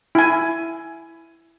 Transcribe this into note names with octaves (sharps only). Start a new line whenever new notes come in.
E4 G#5